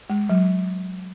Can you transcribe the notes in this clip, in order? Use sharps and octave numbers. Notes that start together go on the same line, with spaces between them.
G#3
F#3